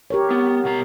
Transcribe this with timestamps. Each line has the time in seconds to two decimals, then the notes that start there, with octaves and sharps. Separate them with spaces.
0.10 G4 A#4 C#5
0.31 B3
0.65 B2 A#5